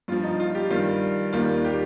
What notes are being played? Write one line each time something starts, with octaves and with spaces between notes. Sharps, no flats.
G2 F3 F4
D#4
F4
G4
G2 D#3 G3 F4
D#2 D#3 G3 F4
G4